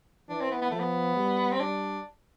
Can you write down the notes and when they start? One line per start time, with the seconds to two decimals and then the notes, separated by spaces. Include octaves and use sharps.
0.29 E3 D4
0.41 C4
0.51 B3
0.62 B3
0.71 F3 A3
0.80 B3
1.16 G3
1.52 C4
1.60 G3 D4